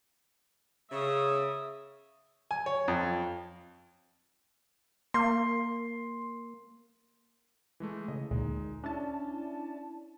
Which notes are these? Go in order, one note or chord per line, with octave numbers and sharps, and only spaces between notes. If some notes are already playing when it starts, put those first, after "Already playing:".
C#3 E5 D#6
G#5
C#5
F2
A#3 C6
E3 G#3 A3
C#3 D#5
D2 A#2 G#3 D#4
C#4 D4 E4 A5